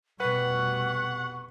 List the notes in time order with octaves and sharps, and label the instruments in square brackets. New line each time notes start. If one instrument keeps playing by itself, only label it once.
[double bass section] F1 B2 G3 [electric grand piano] B4 [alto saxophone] F#5 [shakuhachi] C#6